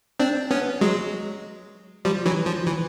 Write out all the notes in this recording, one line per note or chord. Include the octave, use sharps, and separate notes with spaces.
C4 D4
B3 C#4
F#3 G#3
F3 G3
E3 F#3
F3
E3